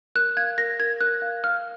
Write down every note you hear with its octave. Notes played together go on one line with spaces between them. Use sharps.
A#4 F#6
F5 G#6
A#4 A#6
A#4 G#6
A#4 F#6
F5
F5 F6